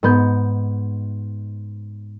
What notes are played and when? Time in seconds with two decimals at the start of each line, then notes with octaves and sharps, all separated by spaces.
0.03 G#2 B3 G6